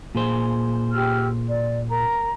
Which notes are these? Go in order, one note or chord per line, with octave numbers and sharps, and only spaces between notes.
A#2 G#4 C5
G4 E6 F6
D5
A#4 A#5